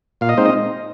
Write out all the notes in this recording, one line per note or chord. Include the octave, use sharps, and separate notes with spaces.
A#2 F5
D#5
G#3 C4 D#4 C5
D#5